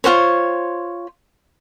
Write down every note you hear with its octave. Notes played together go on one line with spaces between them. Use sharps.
F4 F#4 C5 C#5